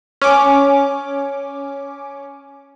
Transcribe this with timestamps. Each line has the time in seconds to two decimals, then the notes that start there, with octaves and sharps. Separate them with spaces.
0.22 C#4 D6